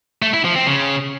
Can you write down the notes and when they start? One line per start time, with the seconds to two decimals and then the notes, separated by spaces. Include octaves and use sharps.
0.22 A3
0.33 E4
0.45 F3
0.56 C4
0.67 C#3